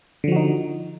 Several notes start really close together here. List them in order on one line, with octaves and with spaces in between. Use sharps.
D3 F3 F#4 D#4